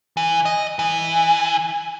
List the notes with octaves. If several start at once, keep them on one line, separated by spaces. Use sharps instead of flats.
E3
D#5
E3